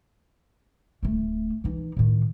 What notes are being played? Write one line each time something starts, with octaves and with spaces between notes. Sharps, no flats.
D1 A3
E3 D#4
A2 D#3